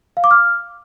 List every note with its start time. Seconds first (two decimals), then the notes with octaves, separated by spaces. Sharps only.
0.17 F5
0.24 D6
0.31 F6